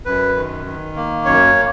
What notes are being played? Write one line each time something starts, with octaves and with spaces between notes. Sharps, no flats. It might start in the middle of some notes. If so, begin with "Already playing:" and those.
F#2 B4
D#3
D#3
A#3
F#2 C#5